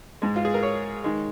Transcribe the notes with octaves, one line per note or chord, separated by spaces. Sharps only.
G#2 G#3
F4
G#4
A#4
C#5
D#3 G#3